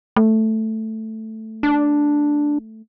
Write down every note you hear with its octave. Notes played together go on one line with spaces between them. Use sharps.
A3
D4